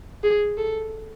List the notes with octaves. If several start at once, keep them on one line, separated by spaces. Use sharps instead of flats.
G#4
A4